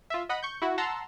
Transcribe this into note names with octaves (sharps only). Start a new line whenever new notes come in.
F4 E5
D#5 F#5 B5
C#6 G6
E4 F#4
F#5 A5 A#5 C6 E6